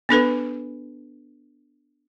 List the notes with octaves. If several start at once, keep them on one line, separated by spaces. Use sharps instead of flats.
B3 D4 A4 B4